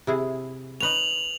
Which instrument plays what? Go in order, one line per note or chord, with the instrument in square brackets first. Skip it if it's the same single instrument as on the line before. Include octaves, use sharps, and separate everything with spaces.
[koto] C3 E4 G#4
[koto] D#4 B4 C#5 [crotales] F7 F#7